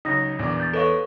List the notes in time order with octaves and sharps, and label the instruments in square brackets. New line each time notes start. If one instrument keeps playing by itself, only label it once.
[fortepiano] C#2 F#3 [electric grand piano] D#4 [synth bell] D#6 A#6
[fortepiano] A#1 D5 D6 [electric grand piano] E2
[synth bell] G6 A6
[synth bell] A4 C#5 C#6 [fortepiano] B4 D#5 F5